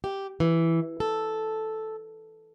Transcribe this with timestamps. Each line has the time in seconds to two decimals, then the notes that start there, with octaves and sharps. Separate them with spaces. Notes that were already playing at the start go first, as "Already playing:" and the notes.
0.04 G4
0.40 E3
1.00 A4